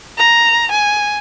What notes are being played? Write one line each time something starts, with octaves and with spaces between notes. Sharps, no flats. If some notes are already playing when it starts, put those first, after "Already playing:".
A#5
G#5